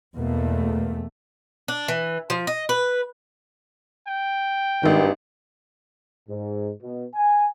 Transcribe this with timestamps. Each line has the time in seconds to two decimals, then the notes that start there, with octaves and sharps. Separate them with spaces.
0.17 E2 B2 A3 A#3
1.68 D4
1.88 E3
2.30 F3
2.47 D#5
2.69 B4
4.08 G5
4.83 G#1 G2 D#3
6.29 G#2
6.82 B2
7.15 G#5